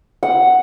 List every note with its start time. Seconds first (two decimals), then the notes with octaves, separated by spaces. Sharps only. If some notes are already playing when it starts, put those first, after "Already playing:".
0.23 F#5